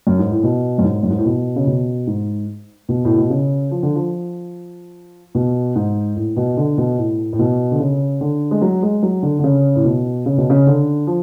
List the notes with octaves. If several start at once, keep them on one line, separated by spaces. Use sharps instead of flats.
F#2
G#2
A2
B2
F#2
G#2
F#2
G#2
A2
B2
C#3
B2
G#2
B2
A2
B2
C#3
F3
D3
F3
B2
G#2
A2
B2
D3
B2
A2
A2
B2
D3
C#3
D3
G#3
F#3
G#3
F#3
D3
D3
C#3
A2
B2
C#3
B2
C#3
D3
F3